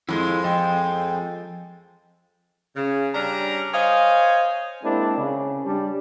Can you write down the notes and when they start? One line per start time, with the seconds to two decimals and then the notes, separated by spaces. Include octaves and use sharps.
0.09 F2 G#3 E4 A4
0.44 F3 A4 D#5 G5
2.76 C#3
3.15 G3 C#4 D4 A#5
3.74 C5 C#5 D#5 F5 G#5
4.84 G#3 A#3 C4 D4 E4
5.18 C#3
5.66 G3 D4